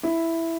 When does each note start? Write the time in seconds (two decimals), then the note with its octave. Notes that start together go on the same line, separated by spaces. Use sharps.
0.03 E4